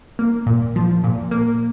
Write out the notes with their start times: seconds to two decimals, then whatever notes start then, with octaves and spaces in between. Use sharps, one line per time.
0.19 A#3
0.47 A#2
0.76 F3
1.04 A#2
1.31 A#3